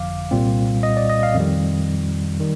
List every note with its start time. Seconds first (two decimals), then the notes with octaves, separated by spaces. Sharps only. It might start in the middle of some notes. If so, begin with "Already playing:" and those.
Already playing: G1 F2 D3 F3 F5 D6
0.31 C2 A#2 G3 C4
0.83 D#5
0.97 D5
1.09 D#5
1.23 F5
1.35 F2 D#3 G3
2.40 D#3 G3